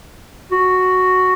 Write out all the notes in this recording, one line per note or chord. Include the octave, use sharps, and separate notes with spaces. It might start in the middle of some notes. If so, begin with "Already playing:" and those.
F#4